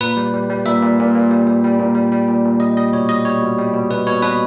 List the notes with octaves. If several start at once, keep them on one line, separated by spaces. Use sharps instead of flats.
A#2 B4
G3
G3
G3
A#2 E5
A#2
A#2
A#2
G3
G3
G3
A#2
G3
G3
A#2
A#2
G3 D#5
G3 D#5
B2 C#5
G3 D#5
G3 C#5
B2
G3
B2
B2 B4
B2 C#5
B2 B4